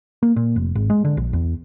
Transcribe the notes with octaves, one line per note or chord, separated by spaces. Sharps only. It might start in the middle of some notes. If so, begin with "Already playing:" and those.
A#3
A#2
F1
G#1
G#3
D3
A#1
E2